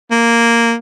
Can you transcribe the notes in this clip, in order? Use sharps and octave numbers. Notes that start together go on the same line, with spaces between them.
A#3